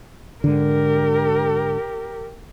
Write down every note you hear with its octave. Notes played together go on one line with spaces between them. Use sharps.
G#2 D3 G4 A#4